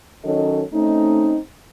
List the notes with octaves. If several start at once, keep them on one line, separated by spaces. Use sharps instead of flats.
D#3 F#3 C#4 A4 D#5
A3 C4 C#4 D#4